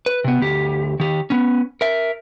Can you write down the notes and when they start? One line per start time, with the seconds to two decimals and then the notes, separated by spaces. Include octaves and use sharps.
0.06 B4
0.24 C3 B3
0.41 D2 G4
1.00 D#3 G4
1.30 B3 C#4
1.81 A#4 E5